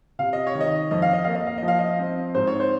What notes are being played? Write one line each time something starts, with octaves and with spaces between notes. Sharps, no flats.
C3 F5
D#5
C#5
D#3
D#5
F2 D#5
F5
D#5
A#3 F5
D#5
F5
D#5
F3
F5
D#5
C4
G#2 C5
C#5
C5